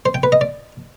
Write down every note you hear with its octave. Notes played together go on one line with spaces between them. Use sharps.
C5
G5
B4
D#5
D5